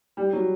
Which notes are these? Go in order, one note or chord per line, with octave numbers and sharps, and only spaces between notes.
G3
F#3